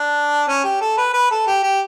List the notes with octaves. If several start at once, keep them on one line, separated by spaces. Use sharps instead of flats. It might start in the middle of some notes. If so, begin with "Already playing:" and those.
Already playing: D4
C#4
G4
A4
B4
B4
A4
G4
G4